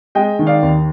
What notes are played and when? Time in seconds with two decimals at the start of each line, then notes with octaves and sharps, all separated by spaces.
0.15 G#3 D#5 G5
0.39 D#3
0.47 D5 F5
0.63 D#2